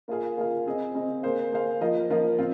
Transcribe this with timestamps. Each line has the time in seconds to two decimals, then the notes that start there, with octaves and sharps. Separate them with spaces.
0.08 A#3 F4 G#4 F5
0.37 A#3 F4 G#4 F5
0.66 C4 G#4 D#5
0.95 C4 G#4 D#5
1.23 A#3 G#4 C5 F5
1.52 A#3 G#4 C5 F5
1.81 F3 A#3 F4 A#4 D#5
2.10 F3 A#3 F4 A#4 D#5
2.39 C4 F4